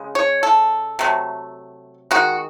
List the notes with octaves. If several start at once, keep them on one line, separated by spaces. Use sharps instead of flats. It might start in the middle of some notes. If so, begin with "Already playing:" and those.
Already playing: C#3 G#3
C#5
A4
C3 F#3 A3
D#3 G#3 F#4